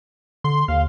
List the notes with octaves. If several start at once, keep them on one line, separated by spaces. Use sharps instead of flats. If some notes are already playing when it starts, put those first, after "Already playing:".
D3 C6
D#2 F5